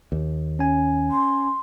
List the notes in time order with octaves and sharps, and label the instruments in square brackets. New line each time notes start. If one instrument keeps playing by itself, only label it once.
[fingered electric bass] D#2
[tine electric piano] C#4 G#5
[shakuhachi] C6